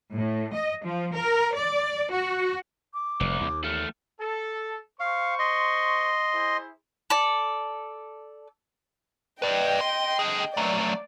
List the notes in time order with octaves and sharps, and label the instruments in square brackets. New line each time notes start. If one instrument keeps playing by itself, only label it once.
[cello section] A2
D#5
F3
A#4
D5
F#4
[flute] D6
[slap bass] F1 [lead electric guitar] C2
[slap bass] D#2
[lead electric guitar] E2 A3 [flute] F6
[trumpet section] A4
[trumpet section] C5 C#6 [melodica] F5
[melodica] D#5 C6
[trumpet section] E4 G#4 C5
[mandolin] A4 D5
[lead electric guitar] B4 D5 [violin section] D#5 G5
[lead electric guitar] C6
D3 G#4
[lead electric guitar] F#3 A3 [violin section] D5